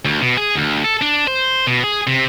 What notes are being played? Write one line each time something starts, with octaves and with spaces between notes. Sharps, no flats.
D2
B2
G#4
D2
A4
D4
C5
B2
G#4
C3